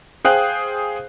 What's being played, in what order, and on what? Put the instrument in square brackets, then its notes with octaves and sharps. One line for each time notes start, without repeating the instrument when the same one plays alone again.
[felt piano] G#4 C5 F5 G5 F#6